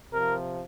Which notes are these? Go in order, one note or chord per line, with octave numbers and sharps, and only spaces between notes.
C3 F3 A#4